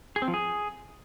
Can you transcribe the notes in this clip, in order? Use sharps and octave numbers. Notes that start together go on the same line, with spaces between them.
G#4
C4
F3
G#4